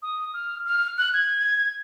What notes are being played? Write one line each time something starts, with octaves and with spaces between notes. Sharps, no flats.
D#6
F6
F6
F#6
G#6